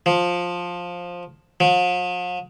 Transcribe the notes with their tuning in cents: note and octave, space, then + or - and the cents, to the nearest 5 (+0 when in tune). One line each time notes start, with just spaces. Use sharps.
F3 +10
F3 +45